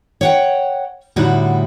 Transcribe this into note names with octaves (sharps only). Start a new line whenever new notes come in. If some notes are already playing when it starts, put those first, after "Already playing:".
C#5 F#5 G5
A2 D3 G3 D#4 E4 F#4